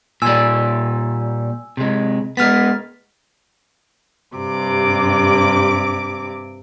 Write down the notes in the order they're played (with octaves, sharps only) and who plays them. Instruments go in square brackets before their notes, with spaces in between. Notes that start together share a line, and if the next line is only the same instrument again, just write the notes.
[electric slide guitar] A#2 G3 [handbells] G#5 E6
[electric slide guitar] C3 G#3
[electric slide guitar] G#3 B3 [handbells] F6 A6 B6
[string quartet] G2 C3 D6